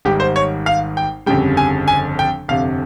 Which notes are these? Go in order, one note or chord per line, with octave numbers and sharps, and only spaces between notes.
G#1 G#2 G3 G4
C5
C#5
F5
G5
G1 F2 C#3 G3 G5
G#5
G#5
G5
G1 F2 C3 F5